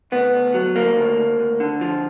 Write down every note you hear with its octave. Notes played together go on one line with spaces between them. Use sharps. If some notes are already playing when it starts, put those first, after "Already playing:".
D2 B3
D2
F#3
D2 A#3
D2
D2
D2
D3
F3